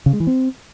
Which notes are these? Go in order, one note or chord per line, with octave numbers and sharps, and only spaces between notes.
C#3
G#3
E3
C4